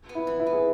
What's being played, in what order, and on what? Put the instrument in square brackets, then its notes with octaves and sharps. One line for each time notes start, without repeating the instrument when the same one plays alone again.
[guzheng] B3
[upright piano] E4
[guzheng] E3
[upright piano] E4
[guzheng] B3
[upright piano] G#4